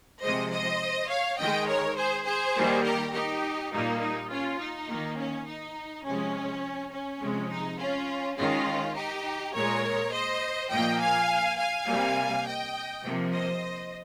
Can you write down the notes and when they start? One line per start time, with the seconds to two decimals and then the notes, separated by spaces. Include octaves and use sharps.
0.21 C3 F3 G#3 C5 D#5
0.51 C5 D#5
1.09 C#5 F5
1.38 D#3 G#3 D#5 G5
1.67 A#4 C#5
1.97 G#4 C5
2.25 G#4 C5
2.55 D#3 G3 A#3
2.84 G4 A#4
3.13 D#4 G4
3.72 A#2 G3 A#3 D#4
4.01 D#4
4.30 C#4 F4
4.59 D#4
4.88 D#3 A#3
5.17 C#4
5.47 D#4
6.04 C3 F3 G#3 C#4
6.92 C#4
7.21 C3 F3 G#3
7.50 D#4
7.79 C#4 F4
8.38 D#3 G#3 C#4 F4
8.96 D#4 G4
9.54 A#2 G#3 A#4 C#5
10.12 C5 D#5
10.71 A#2 F3 A#3 D#5 G5
11.00 F5 G#5
11.58 F5 G#5
11.87 C3 G3 A#3
12.46 D#5 G5
13.04 C3 F3 A#3
13.33 C5 D#5